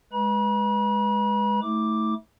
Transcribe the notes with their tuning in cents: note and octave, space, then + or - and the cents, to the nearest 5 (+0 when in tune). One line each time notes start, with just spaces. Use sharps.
G#3 +0 B4 -5 B5 -45
A3 -5 E4 -45 D6 +0